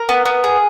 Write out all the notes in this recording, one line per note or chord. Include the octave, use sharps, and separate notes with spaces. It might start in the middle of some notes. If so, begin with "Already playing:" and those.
Already playing: A#4
B3
B3
G#4